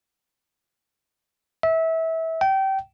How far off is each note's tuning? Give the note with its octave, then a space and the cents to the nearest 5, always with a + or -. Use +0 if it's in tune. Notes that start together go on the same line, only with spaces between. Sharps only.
E5 -25
G5 -25